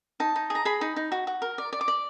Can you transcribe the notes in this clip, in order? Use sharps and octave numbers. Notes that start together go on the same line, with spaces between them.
D#4 A5
D#4
G#4 A#5
G#4 B5
D#4
D#4
F#4
F#4
A#4
D5
D5
D6
D5